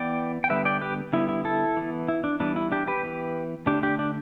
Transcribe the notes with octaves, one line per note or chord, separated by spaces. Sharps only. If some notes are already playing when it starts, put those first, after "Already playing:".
Already playing: E3 B3 D5 G5
G5
D3 G3 B3 B4 E5
D5 G5
G4 B4
D3 G3 B3 E4
E4
E4 A4
E3 B3
E4
D4
E3 G3 B3 D4
E4
D4 G4
G4 B4
E3 B3
D3 A3 D4 G4
D4 G4
D4